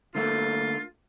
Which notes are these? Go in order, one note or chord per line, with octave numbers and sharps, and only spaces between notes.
D3 A3 A#3 F4